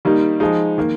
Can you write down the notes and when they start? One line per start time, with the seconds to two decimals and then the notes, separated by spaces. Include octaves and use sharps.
0.05 D#3 G3 A#3 D#4
0.40 F3 G#3 D#4
0.78 D#3 A#3